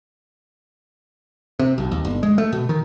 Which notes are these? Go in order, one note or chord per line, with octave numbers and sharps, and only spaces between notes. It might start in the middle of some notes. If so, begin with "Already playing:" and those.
C3
B1
D#2
G1
G#3
A3
B2
D#3